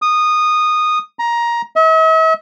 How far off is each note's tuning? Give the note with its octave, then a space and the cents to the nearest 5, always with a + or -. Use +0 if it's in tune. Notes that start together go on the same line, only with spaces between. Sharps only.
D#6 -15
A#5 +15
E5 -45